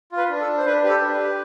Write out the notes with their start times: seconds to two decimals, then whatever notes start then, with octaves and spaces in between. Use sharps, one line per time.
0.12 F4
0.17 B4
0.29 D4
0.41 A4
0.47 D4
0.57 C5
0.65 D4 B4
0.83 G4 B4
0.89 A4
1.02 D4
1.14 B4
1.19 G4